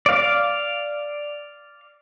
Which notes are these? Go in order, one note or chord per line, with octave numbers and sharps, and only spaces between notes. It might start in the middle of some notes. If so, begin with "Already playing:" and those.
D5 F5